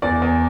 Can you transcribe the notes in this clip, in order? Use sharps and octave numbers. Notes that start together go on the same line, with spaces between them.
E2 D5
E2